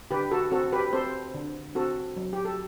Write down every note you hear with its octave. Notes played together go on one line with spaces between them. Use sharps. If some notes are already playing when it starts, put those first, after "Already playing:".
D3 G4 B4
F#4 A4
C4 F#4 A4
G4 B4
C4 A4 C5
D3
C4 F#4 A4
F#3
G4
A4